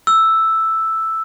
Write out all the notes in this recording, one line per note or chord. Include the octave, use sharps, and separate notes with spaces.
E6